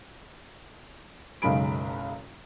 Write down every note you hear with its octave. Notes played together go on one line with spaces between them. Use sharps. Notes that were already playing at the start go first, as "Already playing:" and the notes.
F#1 B1 C#3 G#3 B5 D7